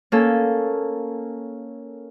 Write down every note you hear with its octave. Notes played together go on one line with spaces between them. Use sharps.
A#3 C#4 A4